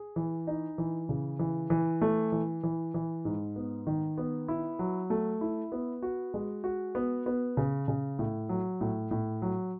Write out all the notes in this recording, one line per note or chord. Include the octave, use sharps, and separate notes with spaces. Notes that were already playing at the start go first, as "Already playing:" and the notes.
Already playing: G#4
E3
D#4
E3
C#3
E3
E3
A3
E3
E3
E3
G#2
B3
D#3
B3
E4
F#3
A3
E4
B3
F#4
G#3
F#4
B3
B3
C#3
C#3
A2
F#3
A2
A2
F#3